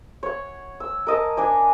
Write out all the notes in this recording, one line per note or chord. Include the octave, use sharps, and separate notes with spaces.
C#5 F#5
E6
A#4 D#5 A5
D4 D5 G#5